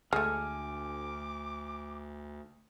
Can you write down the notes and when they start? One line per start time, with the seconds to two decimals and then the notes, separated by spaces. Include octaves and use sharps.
0.13 D2 G#3 A3 G#5 D6 F6